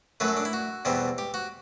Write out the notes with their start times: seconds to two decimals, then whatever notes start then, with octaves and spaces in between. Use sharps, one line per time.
0.20 F#2 F#3 A3 B4
0.28 A4
0.37 D4
0.45 E4
0.53 F#4
0.85 E2 B2 G3 C4
1.18 G4
1.34 F#4